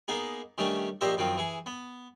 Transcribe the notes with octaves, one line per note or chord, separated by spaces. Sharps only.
A#3 B3 D#4 G#4
D#3 G3 A3 C#4 D4
A#1 A#2 G4 C5 D#5 E5
F#2 D#3 F3 C4
E3 G#4
B3